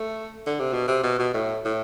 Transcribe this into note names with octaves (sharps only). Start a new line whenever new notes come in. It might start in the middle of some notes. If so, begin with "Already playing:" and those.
Already playing: A3
D3
C3
B2
C3
B2
B2
A2
A2